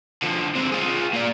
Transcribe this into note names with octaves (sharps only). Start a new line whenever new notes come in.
D3 F3
G#3 C4
F4 G#4
A#3 D5